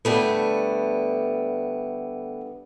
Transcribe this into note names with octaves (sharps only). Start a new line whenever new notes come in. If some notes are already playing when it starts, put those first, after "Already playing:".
D3 G3 A3 B3